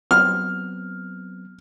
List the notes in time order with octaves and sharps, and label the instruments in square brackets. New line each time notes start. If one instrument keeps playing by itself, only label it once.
[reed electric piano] F#3 B3 C4 [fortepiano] F6